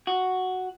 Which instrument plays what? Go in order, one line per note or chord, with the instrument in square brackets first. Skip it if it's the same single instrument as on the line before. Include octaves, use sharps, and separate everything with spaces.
[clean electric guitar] F#4